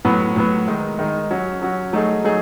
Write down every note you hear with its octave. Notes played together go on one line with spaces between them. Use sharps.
A2 F#3 B3
A2 F#3 B3
D#3 G#3 D#4
D#3 G#3 D#4
F#3 C#4 F#4
F#3 C#4 F#4
F#3 A3 D#4 G#4
F#3 A3 D#4 G#4